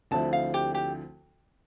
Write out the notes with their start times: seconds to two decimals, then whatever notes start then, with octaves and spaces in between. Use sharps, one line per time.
0.11 D2 D3 F3 C4 E4 A5
0.33 F5
0.54 G4
0.74 G4